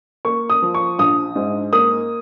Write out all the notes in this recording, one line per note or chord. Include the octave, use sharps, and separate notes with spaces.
A#3 C#6
D#6
F3
C#6
A#1 D#6
G#2
A#3 D#6